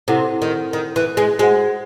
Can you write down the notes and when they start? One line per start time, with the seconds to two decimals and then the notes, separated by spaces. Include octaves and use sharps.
0.08 C3 E4 A4 C5 F#5
0.42 D#3
0.73 D#3
0.96 E3
1.17 G#3
1.39 G#3 F#4 C5 F#5